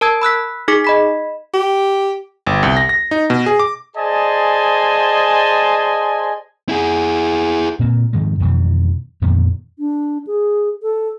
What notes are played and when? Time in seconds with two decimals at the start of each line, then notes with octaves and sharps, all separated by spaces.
0.01 A#4 A5 E6 G#6
0.22 B5 E6 F#6 B6
0.68 D#4 G#4 D6 B6
0.84 D#5 B5 B6
1.54 G4
2.47 G1
2.63 C2
2.77 A#6
2.89 A#6
3.11 D#4
3.30 B2
3.46 G#4
3.59 D6
3.96 G#4 C5 D5 D#5 G#5 A5
6.69 E4 G#4
7.79 A#2 A#3 C4
8.13 G#2 D#3 F3 G#3
8.40 F2 B2 D#3 E3
9.22 F2 A#2 D#3 B3
9.79 D4
10.27 G#4
10.83 A4